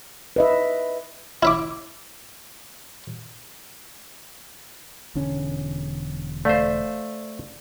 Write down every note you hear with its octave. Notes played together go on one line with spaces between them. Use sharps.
B4 D#5 E5
E4 E5 D6
E1 D3 C#4
A3 C5 D5 F5